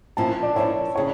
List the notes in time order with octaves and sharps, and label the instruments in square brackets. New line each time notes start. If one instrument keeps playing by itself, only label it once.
[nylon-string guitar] A#2 F3 C#4 E4 [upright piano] A5
[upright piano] D5
[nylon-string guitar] A#2 F3 C#4 E4 [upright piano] C#5
[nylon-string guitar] C#3 [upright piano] C#5